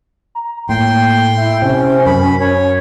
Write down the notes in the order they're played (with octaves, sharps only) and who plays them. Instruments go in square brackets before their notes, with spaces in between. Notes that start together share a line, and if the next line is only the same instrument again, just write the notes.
[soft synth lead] A#5
[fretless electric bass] A2 [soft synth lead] A#3 [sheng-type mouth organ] G5 C6
[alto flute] E4 [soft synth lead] E5
[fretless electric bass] C3 [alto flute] C#4 [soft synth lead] C5
[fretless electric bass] F#2 [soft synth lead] A#4 [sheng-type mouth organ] B5
[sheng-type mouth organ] C#5